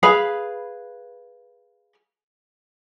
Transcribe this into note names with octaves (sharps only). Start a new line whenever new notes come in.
G#4 B4 F5 B5